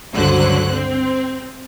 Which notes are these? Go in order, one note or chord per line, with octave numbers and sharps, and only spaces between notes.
C#2 G2 D3 F#3 C5 F#6
C4